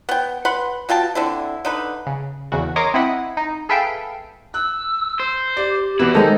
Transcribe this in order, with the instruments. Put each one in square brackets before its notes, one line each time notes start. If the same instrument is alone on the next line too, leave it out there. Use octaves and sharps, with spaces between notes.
[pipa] B3 G5
B4 F#5 B5 C6
B2 F4 G5 A5
D3 C4 E4
D3 D#4 B4
[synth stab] C#3
E2 C#3 F#4
A#4 C#5 D#5 A#5 C6 D6
C4 E4 D#5 F#5 B5
D#4
G#4 A4 B4 E5 F5 G5
[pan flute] E6 [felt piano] F#6
[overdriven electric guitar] C5
[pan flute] G4 [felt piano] D5
[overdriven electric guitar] E2 E4 [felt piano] B2 B4
[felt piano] D#3 [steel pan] G#3 A4 [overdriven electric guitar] D#4 [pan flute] C5